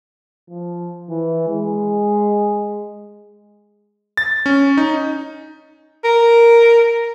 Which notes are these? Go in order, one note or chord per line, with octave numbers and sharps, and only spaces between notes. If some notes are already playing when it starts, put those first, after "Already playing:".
F3
E3
G#3
A6
C#4
D#4
A#4